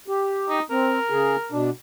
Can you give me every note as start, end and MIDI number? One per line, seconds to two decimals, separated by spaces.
0.08 0.59 67
0.49 0.62 63
0.70 0.99 60
0.70 1.54 70
1.10 1.36 49
1.10 1.36 68
1.52 1.70 47
1.52 1.70 62